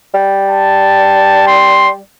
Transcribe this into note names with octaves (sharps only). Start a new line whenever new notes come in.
G3
A5
C6